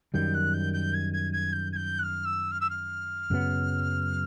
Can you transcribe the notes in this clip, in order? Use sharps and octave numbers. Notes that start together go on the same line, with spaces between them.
F#2 D#3 G3 G6
F#6
G6
G6
G#6
G#6
G#6
G6
G#6
G6
F#6
F6
E6
F6
E6
F6
F#2 C#3 F#3 B3